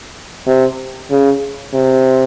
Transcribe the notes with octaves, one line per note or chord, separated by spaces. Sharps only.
C3
C#3
C3